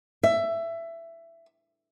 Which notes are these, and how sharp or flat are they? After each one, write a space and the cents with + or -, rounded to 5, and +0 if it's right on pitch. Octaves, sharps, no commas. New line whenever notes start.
E5 +15